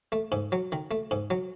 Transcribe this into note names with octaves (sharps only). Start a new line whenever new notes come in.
A3
G#2
F#3
D#3
A3
G#2
F#3